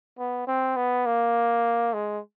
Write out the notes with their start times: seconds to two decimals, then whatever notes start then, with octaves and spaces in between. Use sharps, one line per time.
0.19 B3
0.47 C4
0.76 B3
1.06 A#3
1.93 G#3